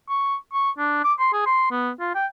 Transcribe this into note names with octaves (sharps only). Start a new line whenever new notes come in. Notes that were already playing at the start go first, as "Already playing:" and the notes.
C#6
C#6
D4
D6
C6
G#4
C6
B3
F4
G5